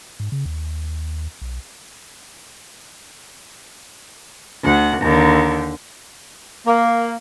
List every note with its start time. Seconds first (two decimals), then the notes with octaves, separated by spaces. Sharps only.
0.20 G#2
0.32 C#3
0.45 D#2
1.42 B1
4.64 D2 F#5
5.02 D#2 D3
6.67 A#3